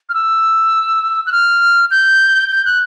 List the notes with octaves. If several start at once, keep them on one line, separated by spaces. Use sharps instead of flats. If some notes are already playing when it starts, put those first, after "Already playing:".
F6
E6
F#6
F6
G6
G6
F#6